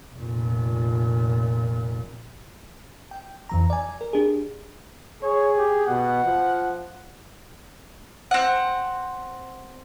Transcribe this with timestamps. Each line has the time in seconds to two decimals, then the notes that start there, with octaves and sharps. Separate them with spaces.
0.14 F1 A#2
3.11 G5
3.49 F2 E3 A#5
3.70 D5 G#5
4.01 A#4
4.13 D4 G4 G#4
5.23 G#4 C#5
5.57 G4
5.87 B2 F#5
6.24 F3
8.31 C4 F#5